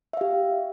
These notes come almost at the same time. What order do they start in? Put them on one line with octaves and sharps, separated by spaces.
E5 F5 G4